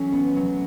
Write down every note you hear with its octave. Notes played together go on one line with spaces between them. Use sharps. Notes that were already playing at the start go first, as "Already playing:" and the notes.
Already playing: F#3 A3 C#4
B3
F#3